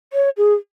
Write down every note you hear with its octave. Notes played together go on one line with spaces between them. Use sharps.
C#5
G#4